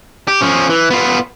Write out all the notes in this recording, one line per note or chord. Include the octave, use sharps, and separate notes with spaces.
G4
F3 C#4
E3
B3 F4